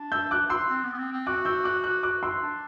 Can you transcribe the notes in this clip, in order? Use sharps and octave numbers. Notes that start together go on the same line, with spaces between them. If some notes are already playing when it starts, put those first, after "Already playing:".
Already playing: D4
E6 G6
D6 F#6
C6 E6
C4
B3
B3
C4
C4
F#4 D6 F#6
E6 G6
D6 F#6
D6 F#6
D6 F#6
C6 E6
D4